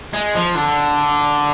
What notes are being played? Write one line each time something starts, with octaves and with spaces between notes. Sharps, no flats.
G#3
F3
D3